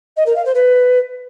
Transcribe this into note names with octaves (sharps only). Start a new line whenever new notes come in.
D#5
A#4
F5
C5
B4